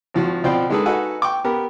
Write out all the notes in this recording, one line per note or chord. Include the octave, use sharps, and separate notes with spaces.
G#1 F3 F#4
B2 F3 C4 F4 D5 G5
D#3 G#3 D4 G#4 A4 B4
D#4 F#4 A4 B4 F#5 G#5
G5 C#6 D6
B3 G4 A#4